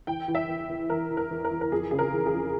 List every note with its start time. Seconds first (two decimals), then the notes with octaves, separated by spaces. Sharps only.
0.07 E3 G5
0.28 E3
0.35 E5
0.48 E2
0.69 E2
0.90 E3 A#4
1.11 E3
1.17 A#4
1.31 E2
1.44 A#4
1.51 E2
1.61 A#4
1.72 F2 G#4
1.91 C#3 G#4
1.99 A#4
2.12 E3
2.26 G#4
2.33 F2